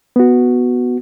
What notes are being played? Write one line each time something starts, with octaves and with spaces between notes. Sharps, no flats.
B3 F#4